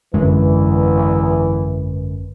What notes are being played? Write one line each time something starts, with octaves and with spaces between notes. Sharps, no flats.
G#1 F#2 D3 E3 G#3 B4